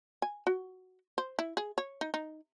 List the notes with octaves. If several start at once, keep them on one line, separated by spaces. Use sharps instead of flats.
G#5
F#4
C5
E4
G#4
C#5
D#4
D#4